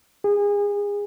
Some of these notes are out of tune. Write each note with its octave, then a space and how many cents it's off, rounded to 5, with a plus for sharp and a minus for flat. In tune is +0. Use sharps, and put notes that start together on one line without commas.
G#4 -30